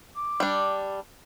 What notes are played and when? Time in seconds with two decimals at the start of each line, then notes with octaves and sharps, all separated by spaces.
0.16 D6
0.40 G3 D4